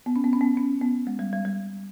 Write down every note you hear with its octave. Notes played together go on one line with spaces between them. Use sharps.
B3
C#4
B3
C#4
B3
C#4
B3
G#3
G3
G3
G3